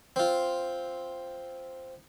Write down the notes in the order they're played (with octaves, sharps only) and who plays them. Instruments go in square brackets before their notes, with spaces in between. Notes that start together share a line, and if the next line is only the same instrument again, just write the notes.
[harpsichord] C4 F4